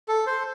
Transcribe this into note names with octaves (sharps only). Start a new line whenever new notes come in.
A4
C5